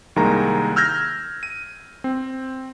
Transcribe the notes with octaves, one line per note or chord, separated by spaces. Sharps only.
C2 D#3 G#3 A#3 A#5
E6 F6 G6 G#6 A#6
D#7
C4